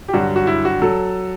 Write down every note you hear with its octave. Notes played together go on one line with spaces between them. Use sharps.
G4
G2 D3 F#3 F#4
F#4
E4
F#4
F#3 A4